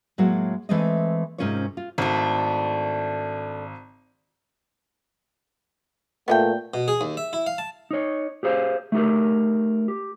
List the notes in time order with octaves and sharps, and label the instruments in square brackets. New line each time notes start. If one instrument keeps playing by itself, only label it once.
[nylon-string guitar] A2 F#3 G#3 A#3 F#4 F#5
E3 G#3 A3 C4 A4 D#5
G#2 C3 C#4 F4 A#4 C#5
F4
[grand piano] G#1 [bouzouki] A3 D4
[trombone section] A#2 A3 [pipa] B3 D#5 G5
[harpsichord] B2
G#4
D#2
E5
E4
F5
A5
[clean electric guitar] D#4 C#5
G4 G#4 C5 F5
A3 D#4 G4 A#4
G4